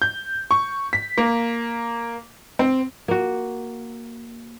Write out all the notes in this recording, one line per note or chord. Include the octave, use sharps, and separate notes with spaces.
G6
C#6
B6
A#3
C4
A#3 F#4